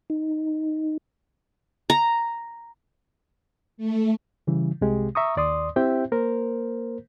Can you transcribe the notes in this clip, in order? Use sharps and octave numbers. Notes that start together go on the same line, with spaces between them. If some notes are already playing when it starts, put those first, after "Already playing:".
D#4
A#5
A3
C#3 E3 G3 E4
C2 C3 G#3 G4
E5 A#5 C#6 D#6
D#2 D5 C6 D#6
C4 E4 G4 C5 E5 G5
A#3 A#4 C5